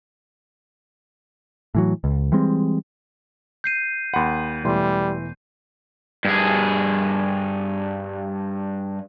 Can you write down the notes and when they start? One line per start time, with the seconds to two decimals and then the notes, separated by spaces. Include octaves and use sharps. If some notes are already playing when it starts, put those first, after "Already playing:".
1.75 A2 E3 F#3
2.04 C#2
2.32 E3 G3 G#3 C4
3.64 G6 C7 D#7
4.14 D#2 F#5 B5 C6
4.65 E1 E3 G3 A3 C6
6.25 G2 G#4